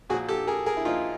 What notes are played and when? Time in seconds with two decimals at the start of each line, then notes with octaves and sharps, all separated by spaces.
0.10 A#2 F#4 G#4
0.14 F3
0.29 G4 A4
0.47 G#4 A#4
0.66 G#4 A#4
0.77 E4
0.85 A#2 F3 D#4 F4